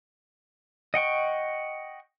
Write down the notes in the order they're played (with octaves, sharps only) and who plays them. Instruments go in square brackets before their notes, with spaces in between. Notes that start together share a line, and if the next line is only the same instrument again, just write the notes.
[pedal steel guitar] D#5 F#5 G5 C#6